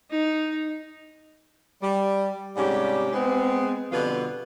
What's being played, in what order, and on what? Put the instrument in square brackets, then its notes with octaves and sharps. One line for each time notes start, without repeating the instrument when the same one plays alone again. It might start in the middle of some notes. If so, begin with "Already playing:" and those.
[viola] D#4
[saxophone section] G3
G#2 C3 G3 C#4 G4
G#3 B3 C4
F2 B2 D3 G3 F4 B4